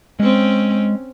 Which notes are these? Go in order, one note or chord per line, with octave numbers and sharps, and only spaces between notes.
G#3 C4 C#4